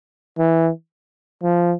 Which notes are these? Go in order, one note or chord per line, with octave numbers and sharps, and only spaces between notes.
E3
F3